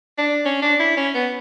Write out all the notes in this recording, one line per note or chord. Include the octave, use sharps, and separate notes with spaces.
D4
C#4
D4
E4
C#4
B3